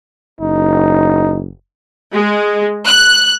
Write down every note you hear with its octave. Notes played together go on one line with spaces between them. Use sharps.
F#1 D#4
G#3
F#6